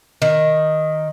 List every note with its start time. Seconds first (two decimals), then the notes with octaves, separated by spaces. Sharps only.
0.22 D#3